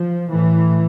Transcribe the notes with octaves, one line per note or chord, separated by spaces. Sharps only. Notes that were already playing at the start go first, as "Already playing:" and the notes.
Already playing: F3
A2 E3